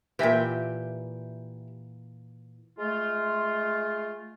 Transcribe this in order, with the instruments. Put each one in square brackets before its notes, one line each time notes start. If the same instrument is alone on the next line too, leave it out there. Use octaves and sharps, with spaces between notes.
[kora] A#2 E3 [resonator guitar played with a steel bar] G4 E5 G5
[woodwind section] G#3 A3 F4